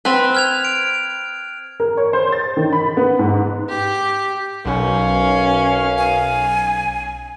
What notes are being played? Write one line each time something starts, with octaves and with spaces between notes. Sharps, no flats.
C4 B4 F#6
F6 G#6 F7
D7
A#4
C#5
C5
A6
D#3
B5
B3
G#2
G4
B1 F#2 C#4 B4 F5
G#5